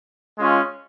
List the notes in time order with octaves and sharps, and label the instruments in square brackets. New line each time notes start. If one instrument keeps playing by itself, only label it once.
[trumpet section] G#3 C#4 F4